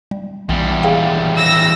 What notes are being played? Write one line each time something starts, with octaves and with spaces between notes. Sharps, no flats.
G3
A#1 E2 G3
G#4 F5 G5
E6 A#6